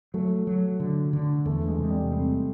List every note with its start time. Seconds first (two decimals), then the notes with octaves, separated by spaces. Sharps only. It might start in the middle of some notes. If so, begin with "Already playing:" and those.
0.14 F#3 A3
0.47 F#3
0.80 D3
1.13 D3
1.45 E2 A3
1.68 G#3
1.79 C3
1.90 G3
2.12 A3 C4